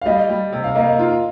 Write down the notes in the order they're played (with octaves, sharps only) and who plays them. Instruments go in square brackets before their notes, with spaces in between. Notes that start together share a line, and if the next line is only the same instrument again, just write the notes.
[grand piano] F5
[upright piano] G3 [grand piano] D#5
[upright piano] G3
C3
[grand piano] F5
[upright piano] A#3 [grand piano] D#5
[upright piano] F4